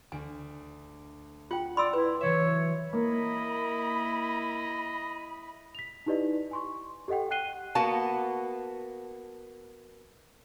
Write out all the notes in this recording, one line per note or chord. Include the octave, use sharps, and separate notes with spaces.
D2 G#5
F4 F#5 G5
D5 B5 C6 E6
E4 B4
E3 F#3 C#5 E5
A#3 E4 D#5 B5
B6 F7
D#4 E4 G4 B4 D5 D#5
G#5 C6 C#6
G4 A4 D#5 F#5 G5
F#5 G5 F#6 C7 D#7 G7
A#3 B3 F#4 A5